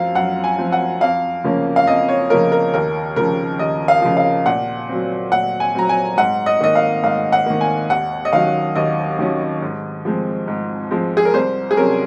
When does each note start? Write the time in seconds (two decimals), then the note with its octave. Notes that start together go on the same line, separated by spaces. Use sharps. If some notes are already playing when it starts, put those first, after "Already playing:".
Already playing: F#2 F3 C4 F5
0.15 F#2 F#5
0.44 G#5
0.58 F3 C4
0.72 F#5
1.01 F2 F5
1.44 C#3 F3 A#3 C#4
1.76 F5
1.87 F2 D#5
2.09 C#5
2.30 C#3 F3 A#3 C#4 A#4
2.52 A#4
2.74 D#2 A#4
3.16 C#3 F3 A#4
3.59 D#2 D#5
3.88 F5
4.02 C#3 F3
4.17 F5
4.46 A#2 F#5
4.89 F#3 C4
5.32 A#2 F#5
5.60 G#5
5.75 F#3 C4 A#5
5.89 G#5
6.17 G#2 F#5
6.46 D#5
6.60 D#3 A#3 D#5
6.75 F5
7.04 G#2 F5
7.32 F#5
7.46 D#3 A#3
7.61 G#5
7.90 D#2 F#5
8.25 D#5
8.33 D#3 F#3 C#4 F5
8.76 D#2 D#5
9.19 D#3 F#3 C#4
9.62 G#2
10.05 F3 G#3 C4
10.48 G#2
10.91 F3 G#3 C4
11.17 G#4
11.25 A#4
11.34 C2 C5
11.71 G#4
11.77 C3 F#3 C#4 A#4